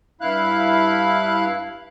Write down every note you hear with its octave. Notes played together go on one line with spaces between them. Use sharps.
G2 E4 F5 F#6